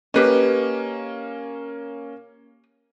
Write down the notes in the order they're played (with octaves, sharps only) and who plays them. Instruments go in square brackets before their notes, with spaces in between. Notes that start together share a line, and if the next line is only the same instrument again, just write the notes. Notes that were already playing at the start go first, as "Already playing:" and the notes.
[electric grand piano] A#3 C#4 [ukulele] G4 B4 D#5